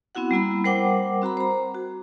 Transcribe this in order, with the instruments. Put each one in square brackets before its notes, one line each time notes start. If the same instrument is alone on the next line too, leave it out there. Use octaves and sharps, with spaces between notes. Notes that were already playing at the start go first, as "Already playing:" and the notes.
[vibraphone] B3 C4 E4 F#4 F#5
G3 A#3 E4 B5
G3 A#4 C5 F#5 G5 D6
C4 F#4 A#5 B5
C5 A#5
F#4